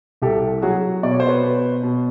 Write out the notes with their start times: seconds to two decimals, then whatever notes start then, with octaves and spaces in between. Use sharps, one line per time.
0.22 C2 G4 A4
0.62 F#3 F#4 G#4
1.03 B2 D5
1.11 C#5
1.20 C5
1.27 B4 C#5
1.43 B2
1.83 B2